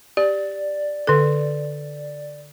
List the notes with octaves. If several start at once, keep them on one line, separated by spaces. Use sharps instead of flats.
G4 D5
D3 A4